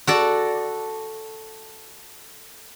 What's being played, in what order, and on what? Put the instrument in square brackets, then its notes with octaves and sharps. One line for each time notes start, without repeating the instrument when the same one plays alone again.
[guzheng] F#4 A4 D5